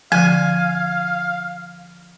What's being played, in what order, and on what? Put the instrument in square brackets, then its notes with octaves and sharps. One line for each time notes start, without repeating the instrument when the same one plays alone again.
[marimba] D3 F3 [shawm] F5 [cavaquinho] G#5